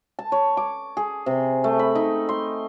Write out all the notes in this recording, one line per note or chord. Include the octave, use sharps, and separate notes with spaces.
A5
C#5
D6
G#4
C3
A3
B5
D#4
C6